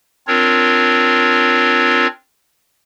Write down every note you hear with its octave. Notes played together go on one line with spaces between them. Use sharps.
C4 D4 F4 A#4 C#5